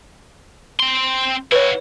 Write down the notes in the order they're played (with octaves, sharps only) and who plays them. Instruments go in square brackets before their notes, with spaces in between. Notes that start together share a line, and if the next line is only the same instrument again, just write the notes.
[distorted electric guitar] C4 C6
[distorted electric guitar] E4 F#4 [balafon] B4 C#5